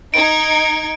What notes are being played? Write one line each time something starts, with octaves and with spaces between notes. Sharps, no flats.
D#4 G#6 D7